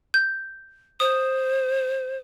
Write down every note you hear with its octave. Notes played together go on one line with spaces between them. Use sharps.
G6
C5 D#6